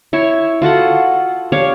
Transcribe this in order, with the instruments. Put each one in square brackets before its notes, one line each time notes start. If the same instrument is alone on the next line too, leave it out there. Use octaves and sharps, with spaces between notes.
[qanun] E4 C#5 E5
F4 F#4 A4 F#5
D4 G4 C#5 F5